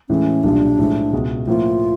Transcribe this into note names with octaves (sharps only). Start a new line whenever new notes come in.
A2 E3 G#3 C#4
B1 A#2 G3 D4
A2 F3 G#3
C#2 B2 G#3
A2 F3 A#3 F4